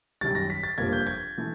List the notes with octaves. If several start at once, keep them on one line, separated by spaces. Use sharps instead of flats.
F#2 D#3 G3 A6
A#6
B6
A6
G1 F2 C3 F3 A#3 G#6
G6
G#6
E3 A3